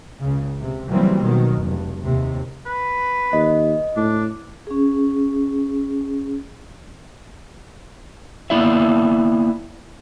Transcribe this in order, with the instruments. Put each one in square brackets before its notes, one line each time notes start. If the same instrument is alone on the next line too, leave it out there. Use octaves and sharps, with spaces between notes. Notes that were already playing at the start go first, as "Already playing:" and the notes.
[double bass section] C#2 C#3
C3
C#3 E3 F#3 G3 A#3 C4
B2 D#3 F#3
F1 G2
D#2 C3
[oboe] B4
[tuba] D#2 [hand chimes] D#5
[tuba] A2 [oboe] D4
[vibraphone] C#4 G#4
[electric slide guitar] A#3 B3 E4 D5 E5